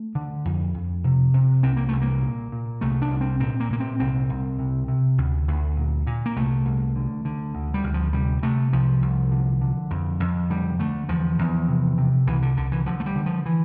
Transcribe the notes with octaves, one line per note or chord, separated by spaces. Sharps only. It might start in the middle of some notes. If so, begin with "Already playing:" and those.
Already playing: A3
D3
F2
F2
C3
C3
C2 C4
A#3
C2 A3
A#3
A#2
A#2
C2 A3
D4
C2
C4
A#2 C4
A#3
A#2 A#3
C4
C2 C4
C2
C3
C3
D2
D2
A#2
A#2
A#3
C2 A3
C2
D3
D3
D2
G3
D2
F3
C3 G3
C3 A3
C2 F3
C2
D3
D3
F2
F2
D3 G3
D3 A3
E2 F3
E2
C3
C3
C2 E3
D3
C2 D3
E3
D3 F3
A3
G3
D3
F3
E3